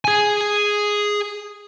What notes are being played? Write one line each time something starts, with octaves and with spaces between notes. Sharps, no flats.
G#4 G#5